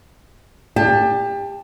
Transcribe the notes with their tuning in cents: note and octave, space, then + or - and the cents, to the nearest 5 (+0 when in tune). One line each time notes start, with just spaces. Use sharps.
G4 +30 A5 +0